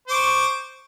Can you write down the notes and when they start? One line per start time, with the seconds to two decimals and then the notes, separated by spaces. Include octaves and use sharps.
0.08 C5
0.11 D6
0.14 C#6